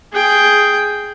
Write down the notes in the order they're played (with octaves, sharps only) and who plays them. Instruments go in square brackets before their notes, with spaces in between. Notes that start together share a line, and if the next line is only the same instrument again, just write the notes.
[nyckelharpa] G#4 G5